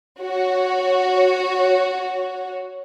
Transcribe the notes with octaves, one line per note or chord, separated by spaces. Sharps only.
F#4 C#5